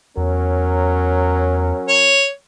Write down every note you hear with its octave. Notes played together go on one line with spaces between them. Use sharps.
E2 F#3 C#4 A#4
C#5